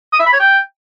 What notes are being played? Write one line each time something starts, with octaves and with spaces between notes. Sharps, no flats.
D#6
E5
B5
C#5
G5